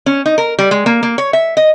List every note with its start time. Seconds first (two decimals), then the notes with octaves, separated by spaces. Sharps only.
0.06 C#4
0.26 D#4
0.38 A#4
0.59 G3
0.71 G#3
0.86 A#3
1.03 A#3
1.18 C#5
1.33 E5
1.57 D#5